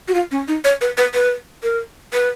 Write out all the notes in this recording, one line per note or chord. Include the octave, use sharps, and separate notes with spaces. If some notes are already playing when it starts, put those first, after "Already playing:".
F#4
F4
C#4
D#4
C#5
B4
B4
B4
A#4
B4